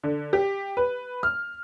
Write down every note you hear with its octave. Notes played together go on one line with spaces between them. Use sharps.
D3
G4
B4
F6